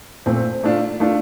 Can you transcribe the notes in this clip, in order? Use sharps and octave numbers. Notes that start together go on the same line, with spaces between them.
A#2 A3 C4
A3 D4 F4
A3 D4 F4